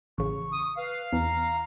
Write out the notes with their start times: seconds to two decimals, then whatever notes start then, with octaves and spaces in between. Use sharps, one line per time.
0.18 A1 C#3 C#6
0.52 D#6
0.77 B4 F5
1.13 E2 E3 A#5